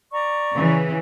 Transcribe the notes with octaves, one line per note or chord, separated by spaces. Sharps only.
D5 A#5 C#6
C#3 E3